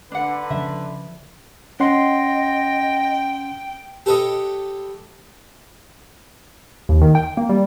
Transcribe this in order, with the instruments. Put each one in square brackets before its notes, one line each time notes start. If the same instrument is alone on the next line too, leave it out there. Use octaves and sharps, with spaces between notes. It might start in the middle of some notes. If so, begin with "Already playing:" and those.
[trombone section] D3 B4 [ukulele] D4 F#5
[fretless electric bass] C#3 F3 [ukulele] E5
[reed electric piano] C#4 F#5 C6 [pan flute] D#5 [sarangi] G5
[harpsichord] G4 A4 B4 C#5 D#5
[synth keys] D#2
D#3
G5
A#3
G3